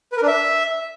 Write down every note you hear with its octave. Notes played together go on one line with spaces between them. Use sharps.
B4
A#4
D4
E5